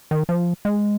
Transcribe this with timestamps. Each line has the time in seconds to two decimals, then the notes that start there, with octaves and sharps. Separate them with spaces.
0.11 D#3
0.29 F3
0.65 G#3